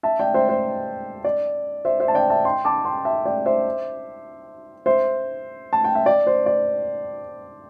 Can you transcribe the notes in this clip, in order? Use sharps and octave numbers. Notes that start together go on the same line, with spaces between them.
E5 A5
D5 G5
C5 E5
C5
D5
C5 E5
C5 E5
A5
D5 G5
E5 A5
G5 C6
A5 D6
G5 C6
E5 A5
D5 G5
C5 E5
C5 E5
A5
G5
E5
D5
C5
D5